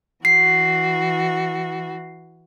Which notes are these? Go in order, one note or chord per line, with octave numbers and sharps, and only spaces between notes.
E3 F#4 C7